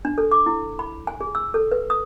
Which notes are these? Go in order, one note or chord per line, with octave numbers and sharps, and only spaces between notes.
D4
A4
D6
E4
B5
G#5
G#4
E6
A4
B4
D#6